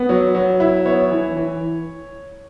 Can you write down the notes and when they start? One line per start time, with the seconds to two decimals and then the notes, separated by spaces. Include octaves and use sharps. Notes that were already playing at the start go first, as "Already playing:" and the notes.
Already playing: B3
0.09 F#3
0.35 F#3
0.60 E4
0.86 B3 C#5
1.11 E3
1.37 E3